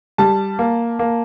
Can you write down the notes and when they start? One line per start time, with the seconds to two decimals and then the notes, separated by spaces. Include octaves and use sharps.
0.18 G3 A5
0.59 A#3
0.99 A#3